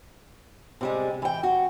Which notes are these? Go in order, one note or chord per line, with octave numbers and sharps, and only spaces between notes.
C3 G3 G#3
E3 G5
F#4